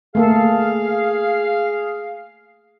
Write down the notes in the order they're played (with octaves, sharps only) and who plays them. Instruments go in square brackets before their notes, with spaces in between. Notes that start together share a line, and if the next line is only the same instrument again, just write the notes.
[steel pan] A3 A#3 A4 [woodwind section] G#4 F5